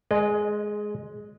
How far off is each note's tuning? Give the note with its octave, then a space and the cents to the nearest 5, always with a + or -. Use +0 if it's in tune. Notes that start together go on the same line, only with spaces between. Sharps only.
G#3 +10 D#5 -30